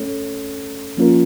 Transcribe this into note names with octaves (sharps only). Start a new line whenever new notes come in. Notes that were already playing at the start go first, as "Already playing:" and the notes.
Already playing: A3 C#4 A4 C#5
F3 A#3 C#4 F4 A#4